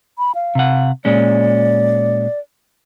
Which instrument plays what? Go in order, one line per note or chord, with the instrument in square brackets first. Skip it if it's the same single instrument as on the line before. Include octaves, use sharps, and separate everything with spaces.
[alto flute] B5
F5
[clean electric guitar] C3 F#5
[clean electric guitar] A#2 G#3 C#4 [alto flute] D5